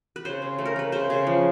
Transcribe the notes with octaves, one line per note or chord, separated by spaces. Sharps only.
B4
C#3 C5
C#3
A3
A#4
A3 B4
C#3 C5
C#3
F3